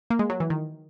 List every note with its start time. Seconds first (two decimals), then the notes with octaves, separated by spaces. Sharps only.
0.10 A#3
0.19 G#3
0.30 F#3
0.40 E3
0.50 D#3